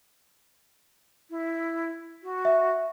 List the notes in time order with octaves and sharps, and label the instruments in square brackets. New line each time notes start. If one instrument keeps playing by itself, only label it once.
[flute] E4
F#4
[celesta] E5